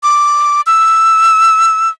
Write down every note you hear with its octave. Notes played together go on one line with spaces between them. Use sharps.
D6
E6